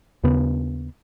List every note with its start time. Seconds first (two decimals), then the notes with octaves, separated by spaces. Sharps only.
0.23 D#2 C#3 B3